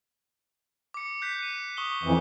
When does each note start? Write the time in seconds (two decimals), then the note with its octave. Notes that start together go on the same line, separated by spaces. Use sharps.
0.94 D6 C#7
1.22 F#6 G6 B6
1.39 C#7 D#7
1.77 C#6 D#6 G7
2.03 F2 E3